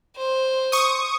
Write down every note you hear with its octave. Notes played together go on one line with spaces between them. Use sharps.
C5
C#6 D#6